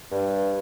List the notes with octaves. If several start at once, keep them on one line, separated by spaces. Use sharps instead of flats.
G2